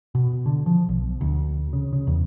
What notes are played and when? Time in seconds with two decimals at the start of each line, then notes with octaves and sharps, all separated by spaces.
0.15 B2
0.46 D3
0.66 F3
0.89 B1
1.21 D2
1.73 C#3
1.93 C#3
2.07 E2